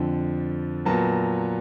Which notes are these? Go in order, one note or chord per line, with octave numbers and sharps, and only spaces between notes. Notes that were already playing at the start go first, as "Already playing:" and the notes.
Already playing: F2 D3 F3
A#2 F#3 B3 A5